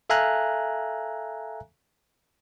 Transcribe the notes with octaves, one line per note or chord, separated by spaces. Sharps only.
A4 E5 F5 G#5 A#5 F#6